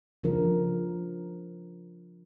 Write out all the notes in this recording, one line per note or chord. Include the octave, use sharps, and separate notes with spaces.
C#3 F3 D4 A#4